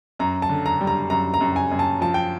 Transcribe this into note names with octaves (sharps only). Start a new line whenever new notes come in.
F#2 A#5
A5
D3
A#5
G3
A#5
F#2 A#5
A#5
F#2
G#5
F#2
A5
F3 A5
G5